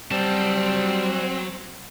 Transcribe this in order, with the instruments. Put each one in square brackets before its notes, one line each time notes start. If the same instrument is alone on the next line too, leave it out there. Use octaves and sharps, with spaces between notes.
[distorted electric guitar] F#3 A5 [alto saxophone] G3 [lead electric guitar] C4